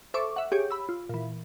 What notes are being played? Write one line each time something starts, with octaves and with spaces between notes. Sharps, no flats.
A4 C5 E5 C#6 D6
E5 F#5
G4 G#4 C#5
B5 E6
F4
A#2 E3